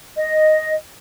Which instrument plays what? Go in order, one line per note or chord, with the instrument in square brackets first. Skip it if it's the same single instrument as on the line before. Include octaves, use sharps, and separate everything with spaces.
[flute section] D#5